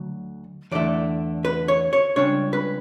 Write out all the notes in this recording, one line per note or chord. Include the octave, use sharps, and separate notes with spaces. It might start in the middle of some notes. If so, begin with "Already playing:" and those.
Already playing: D2 D3 F#3
E2 D3 A3 E4 D5
B4
C#5
C#5
C#2 C#3 G3 D4 C#5
B4